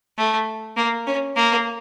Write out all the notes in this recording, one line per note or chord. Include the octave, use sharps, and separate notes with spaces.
A3
A#3
C#4
A#3